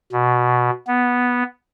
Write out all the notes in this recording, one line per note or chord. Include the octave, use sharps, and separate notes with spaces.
B2
B3